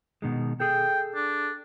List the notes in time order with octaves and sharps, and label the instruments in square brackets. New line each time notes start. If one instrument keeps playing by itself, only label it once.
[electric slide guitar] B2 D#3 G#3
[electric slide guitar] G#4 A4 [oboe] G5
[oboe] D4